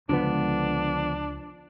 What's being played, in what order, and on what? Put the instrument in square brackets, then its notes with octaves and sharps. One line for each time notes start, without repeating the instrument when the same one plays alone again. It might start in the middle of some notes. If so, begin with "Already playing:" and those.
[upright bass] C#2 G#3 [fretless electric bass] D3 F3 B3 [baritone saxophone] D4